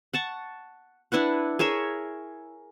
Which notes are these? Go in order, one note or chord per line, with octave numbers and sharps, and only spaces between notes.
F#5 A5 C#6
D4 E4 B4 F#5
G#4 A#4 C#5 E5